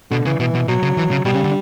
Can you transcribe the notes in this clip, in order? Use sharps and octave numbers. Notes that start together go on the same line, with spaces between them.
B2 D3
C#3 E3
B2 E3
B2
B2 F#3
C#3
E3
C#3
B2 G3
C#3
D3